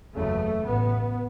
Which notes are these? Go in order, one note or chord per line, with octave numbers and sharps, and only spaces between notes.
F#1 E2 C#3 A3
A1 A2 B3